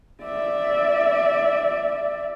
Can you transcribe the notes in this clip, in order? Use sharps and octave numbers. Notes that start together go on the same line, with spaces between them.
D5 E5